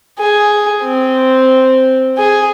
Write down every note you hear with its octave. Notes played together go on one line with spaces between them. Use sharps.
G#4
C4
G#4